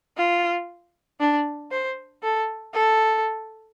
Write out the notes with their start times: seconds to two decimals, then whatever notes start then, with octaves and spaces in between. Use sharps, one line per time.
0.17 F4
1.20 D4
1.71 C5
2.23 A4
2.74 A4